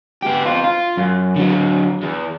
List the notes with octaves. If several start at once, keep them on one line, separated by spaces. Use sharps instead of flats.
B3 G4
C4 F4
F4
F#2
D3 F#3
E2 E3